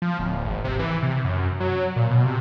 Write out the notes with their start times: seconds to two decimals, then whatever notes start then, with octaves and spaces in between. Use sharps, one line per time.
0.02 F3
0.19 D1
0.45 G#1
0.64 C3
0.79 E3
1.03 C3
1.24 F#2
1.60 F#3
1.96 A#2
2.11 B2
2.25 C3